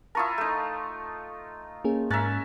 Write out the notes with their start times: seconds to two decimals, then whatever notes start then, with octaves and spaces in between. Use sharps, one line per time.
0.15 E4 F4 A#4 A5 C#6 D#6
0.38 A3 D#4
1.84 A#3 C#4 G#4
2.10 G#2 C#4 A#4 E5 F#6 A6